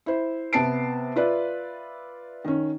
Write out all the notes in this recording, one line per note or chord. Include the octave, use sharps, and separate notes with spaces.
E4 C5
C3 B3 A5 C7 D7
F4 B4 D5 E5
D#3 C#4